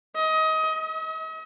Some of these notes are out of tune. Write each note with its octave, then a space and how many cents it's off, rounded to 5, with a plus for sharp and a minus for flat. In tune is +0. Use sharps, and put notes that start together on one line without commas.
D#5 +25
D#5 +45